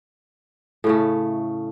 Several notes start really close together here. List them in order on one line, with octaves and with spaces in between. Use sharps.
A2 C#3 A3